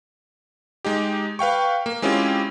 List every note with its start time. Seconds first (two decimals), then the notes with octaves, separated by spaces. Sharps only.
0.85 G#3 D#4 G4
1.39 B4 F5 G5 C#6
1.86 A#3
2.02 G#3 C4 C#4 E4 F4 G4